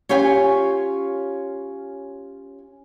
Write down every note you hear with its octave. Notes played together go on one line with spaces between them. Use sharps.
C#4 F4 G4 C#5 G#5